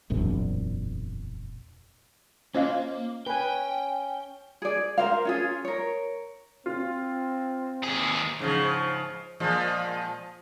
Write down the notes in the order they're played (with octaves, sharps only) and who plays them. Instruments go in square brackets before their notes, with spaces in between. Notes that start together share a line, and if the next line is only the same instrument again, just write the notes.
[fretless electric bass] E1 A#1 F#2 C3
[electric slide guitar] A#3 [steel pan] C#4 F4 [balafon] C5 D#5 F5
[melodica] C#4 [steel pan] B4 G#5 [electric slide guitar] G5
[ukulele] G#4 D5
A#4 C5 F5
C#4 F4 G#4
A#4 C#5
[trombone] C4 [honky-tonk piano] F4
[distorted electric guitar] D#2 G#4
[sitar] G#2 C#3 F3
A#2 F3 G#3